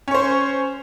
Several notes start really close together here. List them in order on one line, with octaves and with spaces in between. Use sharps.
C#4 C#5 C5